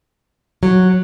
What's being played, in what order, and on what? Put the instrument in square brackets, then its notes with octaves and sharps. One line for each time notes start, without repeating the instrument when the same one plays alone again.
[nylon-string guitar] F#3